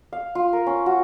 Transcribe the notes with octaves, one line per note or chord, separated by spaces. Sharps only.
F5
F4
A#4
C#4
F#4